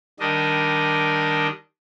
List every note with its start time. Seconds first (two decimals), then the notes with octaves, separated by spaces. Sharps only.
0.20 D#3 G3 D4 D#5